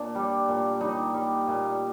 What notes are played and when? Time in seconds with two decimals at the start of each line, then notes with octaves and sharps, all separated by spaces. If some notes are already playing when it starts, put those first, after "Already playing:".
Already playing: A#2 D4
0.15 G3
0.48 A#2
0.81 G3 D#4
1.14 G3
1.47 A#2